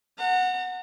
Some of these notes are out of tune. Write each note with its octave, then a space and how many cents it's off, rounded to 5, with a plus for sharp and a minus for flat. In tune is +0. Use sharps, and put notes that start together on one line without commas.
F#5 -10 A#5 -45